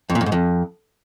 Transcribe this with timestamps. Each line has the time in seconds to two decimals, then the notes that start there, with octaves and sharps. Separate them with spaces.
0.10 F2
0.15 A#2
0.21 F2
0.26 G#2
0.32 F2